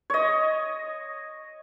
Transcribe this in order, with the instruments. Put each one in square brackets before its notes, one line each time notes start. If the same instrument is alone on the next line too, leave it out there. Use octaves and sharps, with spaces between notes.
[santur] C#5 D#5